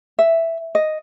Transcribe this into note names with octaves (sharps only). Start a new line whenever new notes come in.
E5
D#5